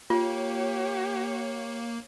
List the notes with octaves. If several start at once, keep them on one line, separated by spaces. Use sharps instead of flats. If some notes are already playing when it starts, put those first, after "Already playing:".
A#3 F4 G4 C#5